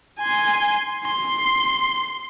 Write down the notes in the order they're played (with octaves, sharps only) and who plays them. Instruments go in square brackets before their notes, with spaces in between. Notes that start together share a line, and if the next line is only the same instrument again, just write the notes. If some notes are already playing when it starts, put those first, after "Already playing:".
[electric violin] G#5 C6
C6